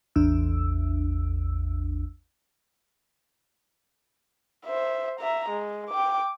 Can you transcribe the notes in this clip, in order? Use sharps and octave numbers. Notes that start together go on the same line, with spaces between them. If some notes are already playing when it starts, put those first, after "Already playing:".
A1 E2 D4 E6
C5 E5
E5 A#5
G#3
G5 D6